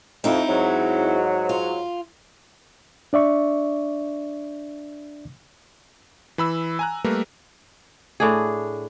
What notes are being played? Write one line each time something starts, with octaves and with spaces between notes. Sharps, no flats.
F2 C4 D#4 E4
G#2 F#3
F4
D4 D5 E5 C#6
E3 B5 E6
G#5 A#5 F#6
G3 A3 A#3 A#4 B4
A2 D4 G#4